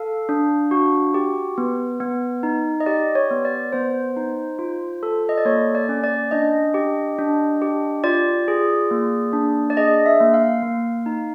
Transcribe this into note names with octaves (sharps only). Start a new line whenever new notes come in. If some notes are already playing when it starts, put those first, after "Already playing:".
Already playing: A4 F5
D4
F#4
G4
B3
B3
D#4
D#5
G4 D5
C#5
B3
D5
B3 C5
D#4
F4
A4
D#5
D5
A#3 C#5
D5
C#4
D5
D4 D#5
G4
D4
G4
F4 D5
G#4
A#3
D4
D5
G#4 D#5
E5
A#3
F5
A#3
D#4